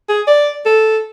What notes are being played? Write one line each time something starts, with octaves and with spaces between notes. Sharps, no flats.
G#4
D5
A4